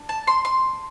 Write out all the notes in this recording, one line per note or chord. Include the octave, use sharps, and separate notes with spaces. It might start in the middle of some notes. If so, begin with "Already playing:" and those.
Already playing: D4
A5
C6
C6